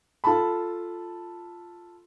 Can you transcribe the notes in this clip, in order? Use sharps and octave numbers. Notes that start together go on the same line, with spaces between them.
F4 A4 A5 B5